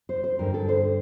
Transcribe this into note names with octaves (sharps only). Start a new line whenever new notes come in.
C5
C5
G2 D3 G3 A#4
A4
C5